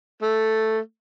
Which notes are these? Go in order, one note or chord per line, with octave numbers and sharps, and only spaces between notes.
A3